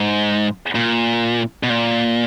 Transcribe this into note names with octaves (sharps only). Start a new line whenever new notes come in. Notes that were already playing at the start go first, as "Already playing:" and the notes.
Already playing: G#2
A#2
B2
A#2